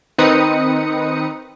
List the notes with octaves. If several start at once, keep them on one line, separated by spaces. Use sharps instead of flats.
D#3 C4 D#4 B4 D#6 C#7